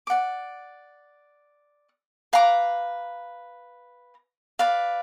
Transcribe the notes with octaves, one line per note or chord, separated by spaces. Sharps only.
D5 F#5 D6
B4 F5 A#5 D6
B4 D5 F5